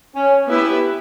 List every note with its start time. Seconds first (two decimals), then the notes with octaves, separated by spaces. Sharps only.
0.16 C#4
0.49 B3 E4 G4 B4 E5